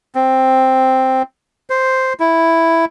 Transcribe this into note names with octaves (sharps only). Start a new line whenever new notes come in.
C4
C5
E4